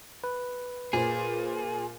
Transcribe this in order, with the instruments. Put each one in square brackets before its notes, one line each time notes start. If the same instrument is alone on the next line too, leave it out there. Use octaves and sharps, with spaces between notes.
[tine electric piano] B4
[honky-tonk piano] A#2 C5 [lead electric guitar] G#4